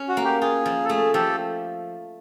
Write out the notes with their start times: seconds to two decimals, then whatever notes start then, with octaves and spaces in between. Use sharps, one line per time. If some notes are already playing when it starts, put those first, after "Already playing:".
Already playing: C#4
0.08 F#4
0.17 A#3
0.25 G4
0.41 F4 G#4
0.66 F3
0.85 A4
0.89 A3 G#4
1.14 F3 G4 A4